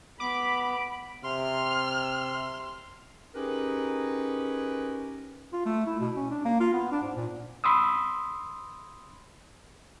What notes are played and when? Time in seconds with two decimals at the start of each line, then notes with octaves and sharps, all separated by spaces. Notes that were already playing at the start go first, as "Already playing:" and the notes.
0.20 B3 B5 D6
1.24 C3 C6 F6
3.35 C#4 D#4 G4 G#4 A#4 B4
5.53 F4
5.66 A3
5.86 E4
6.00 B2
6.16 C#4
6.30 D4
6.45 A#3
6.60 F4
6.73 B3
6.92 D4
7.03 G#2
7.16 A#2
7.64 B5 C6 D#6 E6